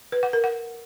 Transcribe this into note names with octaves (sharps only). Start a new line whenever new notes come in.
B4
F#5
A#4
F#5